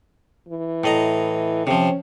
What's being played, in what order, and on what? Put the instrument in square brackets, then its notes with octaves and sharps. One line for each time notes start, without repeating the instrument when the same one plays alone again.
[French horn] E3
[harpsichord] A2 D#5 A#5
[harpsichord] C3 F3 [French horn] C#4